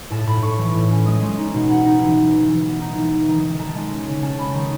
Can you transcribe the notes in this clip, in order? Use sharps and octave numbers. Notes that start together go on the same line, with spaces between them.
A2 A5
A2 B5
A2 C#6
E3
A2
C#4
G#3 D#6
G#3
D#4
B2
D#4 F#5
D#4
E3
E3
E3
E3
B3
D#4
E3
E3
D#3
D#3
D#3 A5
G#3
C#4
C#3
C#4 A5
C#4 B5
D#3 C#6